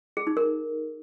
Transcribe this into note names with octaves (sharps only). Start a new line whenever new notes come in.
G#4
D#4
A#4